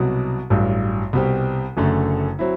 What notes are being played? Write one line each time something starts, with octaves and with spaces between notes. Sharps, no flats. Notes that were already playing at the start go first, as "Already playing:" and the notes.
Already playing: C2 B2 F#3
A1 G2 F#3
C2 B2 G3 C4 G4
F#1 F#2 D3 A3
F#3 C4 E4